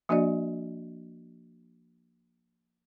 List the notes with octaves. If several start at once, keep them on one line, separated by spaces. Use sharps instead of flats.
F3 A#3 D4 F#4 D5 D#5